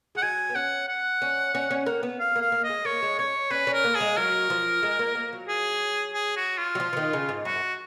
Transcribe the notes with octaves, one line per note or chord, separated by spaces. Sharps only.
G#3 F#5
F#3 G#5
B3
C#4 F#5
F#5
C#4
C#4
C#4
A#3
B3
F5
A#3
F5
A#3
D#5
G#3
A#3 C#5
G#3
C#4 C#5
C#4 B4
C#4
A#4
A#3
G#4
G#3
F#3 A#4
F3
G#3
A#3
A#3
F#3
G#4
G#4
F#4
F4
F#3
F3
F3
D#3
C#3
G#2
F#2 F#4